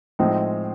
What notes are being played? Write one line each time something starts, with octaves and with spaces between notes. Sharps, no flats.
A2 F3 G#3 C4 D#4